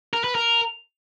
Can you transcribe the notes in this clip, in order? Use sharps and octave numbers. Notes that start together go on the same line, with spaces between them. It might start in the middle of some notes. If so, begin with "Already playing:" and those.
A#4
B4
A#4